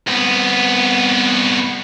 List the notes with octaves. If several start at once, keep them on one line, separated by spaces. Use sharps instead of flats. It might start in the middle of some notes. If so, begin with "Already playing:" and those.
C2 B3